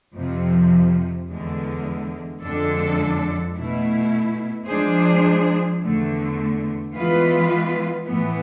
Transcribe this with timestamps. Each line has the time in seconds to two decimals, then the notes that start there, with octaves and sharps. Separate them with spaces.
0.16 F2 C3 F3
1.29 E2 D3 G#3
2.42 F2 D3 G#3 D4 A4
3.55 B2 A3 E4
4.68 F3 G#3 D4 G#4 C5
5.81 E2 D3 A3
6.94 E3 G#3 B3 F4 B4
8.08 A2 E3 B3